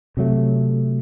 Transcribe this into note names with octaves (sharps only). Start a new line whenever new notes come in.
C3 F#3 A3